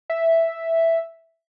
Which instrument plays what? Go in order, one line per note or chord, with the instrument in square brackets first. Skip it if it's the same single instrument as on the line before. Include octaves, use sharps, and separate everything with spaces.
[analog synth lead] E5